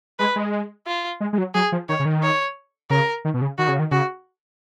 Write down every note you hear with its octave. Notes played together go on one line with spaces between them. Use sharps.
G#3 B4
G#3
F4
G#3
G#3
F#3
F#3 G#4
F3
D#3 C#5
C#3
D#3
C#5
C#3 A#4
D#3
B2
C#3
D#3 F#4
C#3
D#3
C#3 F#4